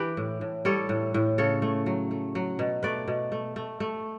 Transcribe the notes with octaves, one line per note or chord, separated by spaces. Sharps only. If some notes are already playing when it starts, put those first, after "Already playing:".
Already playing: E3 G4 B4
A2
A2
G3 A4 C#5
A2
A2
C#3 A4 C#5
A3
F#3
A3
F#3
B2
A3 B4 D5
B2
A3
A3
A3